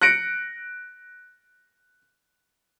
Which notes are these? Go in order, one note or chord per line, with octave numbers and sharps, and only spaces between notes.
F#6 A#6 C#7 D7